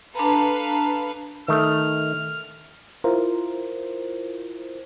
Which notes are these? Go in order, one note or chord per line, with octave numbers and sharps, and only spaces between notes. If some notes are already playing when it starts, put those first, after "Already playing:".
D4 A4 B4 F5 A5 A#5
D#3 A3 F6
E4 F4 A#4 C5